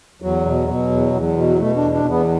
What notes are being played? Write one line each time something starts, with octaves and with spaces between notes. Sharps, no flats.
E2 F#3
B2
B2
E2
E2
B2
F#3
B2 A3
D4
E2
D4
E2
B3